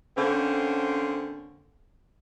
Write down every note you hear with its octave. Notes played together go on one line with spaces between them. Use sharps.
D3 A#3 C4 C#4 C5